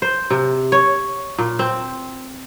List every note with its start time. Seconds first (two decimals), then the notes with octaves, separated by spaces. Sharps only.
0.02 C5
0.30 C3
0.72 C#5
1.39 A#2
1.59 C4